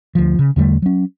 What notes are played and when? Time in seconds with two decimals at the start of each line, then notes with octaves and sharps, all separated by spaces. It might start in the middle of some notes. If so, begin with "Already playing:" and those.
0.15 D2 F3
0.39 C#3
0.56 E2 D3 G3 A3
0.82 F#3 C#4